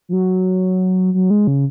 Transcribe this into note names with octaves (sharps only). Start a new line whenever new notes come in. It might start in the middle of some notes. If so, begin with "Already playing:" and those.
F3
F#3
F#3
G#3
C#3